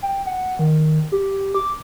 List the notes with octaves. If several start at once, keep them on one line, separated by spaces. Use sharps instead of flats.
G5
F#5
D#3
G4
D6